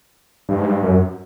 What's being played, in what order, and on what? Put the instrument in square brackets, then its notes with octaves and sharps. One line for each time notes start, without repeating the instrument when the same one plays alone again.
[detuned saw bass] G2
G#2
G2
F#2